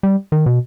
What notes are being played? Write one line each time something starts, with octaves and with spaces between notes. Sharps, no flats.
G3
D#3
B2